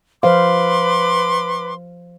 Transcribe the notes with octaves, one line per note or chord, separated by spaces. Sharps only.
F3 B4 C5 F5 C6 D6